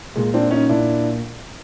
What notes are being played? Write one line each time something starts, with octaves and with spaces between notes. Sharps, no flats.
A#2 G#3
C4 D4
C#4 D#4
A#2 D4 E4